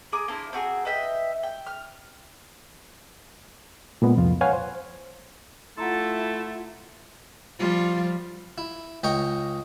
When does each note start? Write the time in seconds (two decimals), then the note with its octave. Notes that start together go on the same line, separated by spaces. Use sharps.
0.12 G#4 A#4 D6 D#6
0.28 A#3 D4 E4 C5
0.53 C4 F#4 G#4 A#4
0.85 B4 D#5 E5 G5
1.43 G5
1.67 F6
4.02 A#2 G#3 B3
4.17 C2 F2 F4
4.41 B4 C#5 F5 F#5 G#5
4.53 C5
5.77 A3 E4 F4 A4 F#5 A#5 C6
7.59 F3 G3 F4
8.58 E4
9.04 C#2 D#5 G5 A#5 C#6